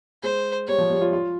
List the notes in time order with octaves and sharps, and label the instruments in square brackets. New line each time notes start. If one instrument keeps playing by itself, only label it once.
[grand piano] G#3 [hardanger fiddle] C5
[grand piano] G3 [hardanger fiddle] C#5
[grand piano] F3
G3
F4
F4